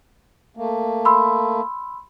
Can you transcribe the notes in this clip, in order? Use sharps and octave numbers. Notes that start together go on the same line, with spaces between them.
A3 A#3
B5 C6 E6